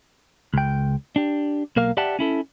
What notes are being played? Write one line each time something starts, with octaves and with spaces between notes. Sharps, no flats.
C#2 G5
D4 G4
B1 A#3 A#4 F5
G4 D5 E5 F#5 G5 A5
C#4 E4 A4